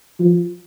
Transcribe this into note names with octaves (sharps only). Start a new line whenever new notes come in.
F3